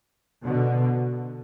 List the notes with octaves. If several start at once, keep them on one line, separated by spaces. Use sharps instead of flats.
B2 D3